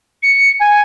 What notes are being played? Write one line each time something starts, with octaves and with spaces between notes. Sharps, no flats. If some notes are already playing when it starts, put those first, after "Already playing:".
C#7
G#5